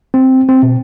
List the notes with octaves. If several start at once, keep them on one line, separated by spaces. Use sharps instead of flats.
C4
C4
B2